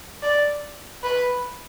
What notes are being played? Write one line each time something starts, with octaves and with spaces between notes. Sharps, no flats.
D5
B4